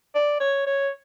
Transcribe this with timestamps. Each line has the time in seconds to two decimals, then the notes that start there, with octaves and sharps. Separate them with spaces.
0.15 D5
0.40 C#5
0.67 C#5